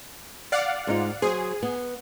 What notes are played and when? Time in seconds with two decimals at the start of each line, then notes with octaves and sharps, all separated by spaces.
0.52 D5 F5 F#5
0.87 G#2 D#4 F4
1.22 F#3 G#4 C5
1.63 B3